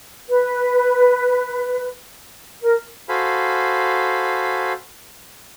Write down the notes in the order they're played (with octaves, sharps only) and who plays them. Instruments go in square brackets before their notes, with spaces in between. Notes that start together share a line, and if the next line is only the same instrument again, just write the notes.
[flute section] B4
A#4
[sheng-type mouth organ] F#4 A4 C5 F5 G#5 B5